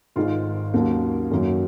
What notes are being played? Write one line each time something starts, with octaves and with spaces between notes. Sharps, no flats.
G#1 G#2 D#3 G#3 F4
D#2 C#3 F#3 A#3
F#2 D#3 F#3 A#3